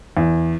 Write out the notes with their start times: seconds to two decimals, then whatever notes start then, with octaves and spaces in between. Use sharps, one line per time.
0.17 E2